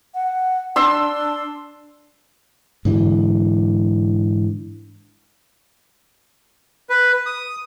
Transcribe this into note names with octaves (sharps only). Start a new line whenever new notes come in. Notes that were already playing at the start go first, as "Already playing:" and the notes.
F#5
D4 C6 E6
G#2 D3 E3
B4
D#6